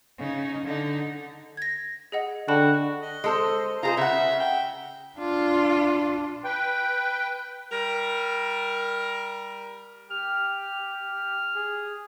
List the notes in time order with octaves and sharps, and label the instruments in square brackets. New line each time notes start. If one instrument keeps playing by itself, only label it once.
[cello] C#3 D#4
D3 D#4
[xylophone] G#6 A#6
G#4 D#5 F#5
[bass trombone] D3 [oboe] F#4 [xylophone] G5 A5 B5
[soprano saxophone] D#5
[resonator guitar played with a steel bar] G#3 A4 C5
[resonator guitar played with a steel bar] F4 G#4 C5 [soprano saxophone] A#5
[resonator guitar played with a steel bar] C#3 F#5 [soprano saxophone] E5
[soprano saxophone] G5
[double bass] D4 [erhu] F4
[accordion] B4 G5
[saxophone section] G3 A#4
[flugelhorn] G4 [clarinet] F6
[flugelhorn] G#4